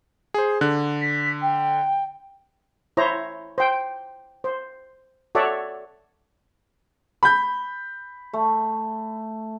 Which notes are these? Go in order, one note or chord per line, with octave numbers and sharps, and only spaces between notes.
G#4 C5
D3 F#6
B6
G5
E4 C5 C#5 A#5
C5 G5
C5
F#4 A4 C#5 D5 E5 F#5
B5 G6
A3